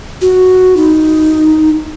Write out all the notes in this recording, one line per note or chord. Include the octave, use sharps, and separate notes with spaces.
F#4
D#4